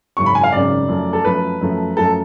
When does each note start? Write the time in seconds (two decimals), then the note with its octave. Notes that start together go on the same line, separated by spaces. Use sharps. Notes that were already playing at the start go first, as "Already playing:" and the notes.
0.17 G#1 F#2 C#3 C#6
0.26 B5
0.35 G#5
0.44 F5
0.52 G#1 F#2 C#3 D5
0.88 F#2 F3 A3
1.13 A4
1.25 F#2 F3 A3 B4
1.61 F#2 F3 A3
1.96 F#2 F3 A3 A4